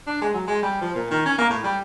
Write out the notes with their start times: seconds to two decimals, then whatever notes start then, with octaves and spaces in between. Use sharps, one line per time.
0.07 D4
0.21 G#3
0.34 F#3
0.48 G#3
0.62 G3
0.81 F3
0.95 A#2
1.11 D#3
1.26 C#4
1.38 A#3
1.50 A2
1.64 G3